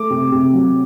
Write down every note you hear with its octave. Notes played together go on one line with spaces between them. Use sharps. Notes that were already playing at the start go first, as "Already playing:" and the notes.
Already playing: A3 D6
C3
C3
F#3